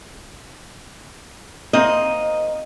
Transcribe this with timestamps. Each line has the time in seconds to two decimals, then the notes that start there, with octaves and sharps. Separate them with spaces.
1.73 A#3 C4 D#4 D#5